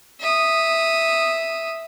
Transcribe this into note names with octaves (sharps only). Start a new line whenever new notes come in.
E5 D#6